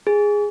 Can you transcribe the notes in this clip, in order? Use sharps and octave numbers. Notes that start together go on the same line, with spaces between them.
G#4